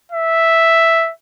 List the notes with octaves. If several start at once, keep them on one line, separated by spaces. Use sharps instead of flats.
E5